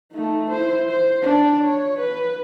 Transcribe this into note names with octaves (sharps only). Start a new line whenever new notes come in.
A3 D#4
E4 C5
C5
D4 D5
C#5
B4